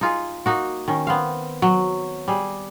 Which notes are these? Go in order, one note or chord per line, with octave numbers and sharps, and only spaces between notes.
D#4 F4 G#4
A#3 D#4 F#4
D#3 C#4
B3 C4 F5
F#3
G3 G#4